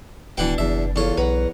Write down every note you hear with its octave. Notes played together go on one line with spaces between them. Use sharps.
D1 B2 E3 D4 F#5 G5
F#1 E2 E5
E2 F4 A4 C#5
B1 B4 F#5 A#5